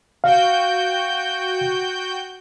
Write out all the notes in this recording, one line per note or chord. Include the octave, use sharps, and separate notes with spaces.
F#4 F5 G5 G6